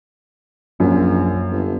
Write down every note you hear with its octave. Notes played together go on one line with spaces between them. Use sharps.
A#1 F#2
G1